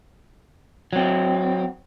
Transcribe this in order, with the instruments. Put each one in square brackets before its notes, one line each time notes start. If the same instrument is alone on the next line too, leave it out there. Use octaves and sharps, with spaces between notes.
[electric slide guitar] F#3 C4